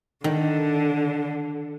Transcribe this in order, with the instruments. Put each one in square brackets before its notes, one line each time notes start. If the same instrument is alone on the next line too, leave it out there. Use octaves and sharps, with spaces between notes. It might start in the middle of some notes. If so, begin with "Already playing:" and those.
[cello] D3 [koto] D#3